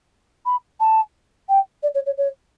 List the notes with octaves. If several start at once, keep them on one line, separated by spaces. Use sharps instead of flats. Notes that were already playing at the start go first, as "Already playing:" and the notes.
B5
A5
G5
D5
C#5
C#5
C#5